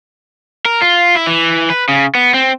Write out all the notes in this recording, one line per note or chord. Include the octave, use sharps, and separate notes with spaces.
A#4
F4
E4
E3
B4
C#3
B3
C4